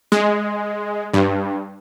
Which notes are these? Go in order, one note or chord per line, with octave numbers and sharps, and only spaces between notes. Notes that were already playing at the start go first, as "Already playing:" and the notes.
G#3
G2